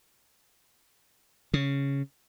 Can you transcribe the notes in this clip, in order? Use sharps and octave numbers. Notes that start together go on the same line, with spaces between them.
C#3